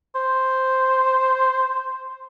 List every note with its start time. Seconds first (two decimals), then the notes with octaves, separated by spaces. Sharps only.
0.15 C5